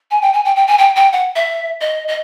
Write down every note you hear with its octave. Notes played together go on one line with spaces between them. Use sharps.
G#5
G5
G#5
G5
G5
G#5
G5
G5
F#5
E5
D#5
D#5